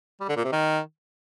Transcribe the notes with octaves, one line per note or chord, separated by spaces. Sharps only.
G3
D3
A#2
C3
D#3